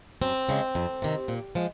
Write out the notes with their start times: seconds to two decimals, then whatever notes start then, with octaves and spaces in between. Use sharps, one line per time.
0.21 F#2 C4
0.49 C#3 F3 G#3
0.75 F2
1.02 C3 D#3
1.28 A#2
1.55 F3 G#3